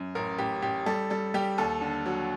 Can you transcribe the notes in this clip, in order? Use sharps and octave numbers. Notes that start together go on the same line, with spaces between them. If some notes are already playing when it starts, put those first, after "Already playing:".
Already playing: F#2
A1 A#4
A1 G4
A1 G4
G3 A4
G3 A4
G3 G4
D#2 A4
D3
F#3